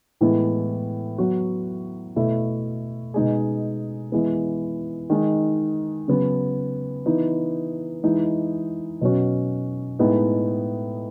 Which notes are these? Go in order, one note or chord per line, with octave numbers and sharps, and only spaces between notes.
A2 E3 G#3 B3
F#3 B3 F#4
B2 A3 E4
B2 G#3 D#4 G#4
E3 G#3 B3
D#3 G#3 D#4
C#3 F#3 B3
E3 B3 D#4
E3 G#3 D#4
B2 F#3 C#4 F#4
A2 G#3 B3 D#4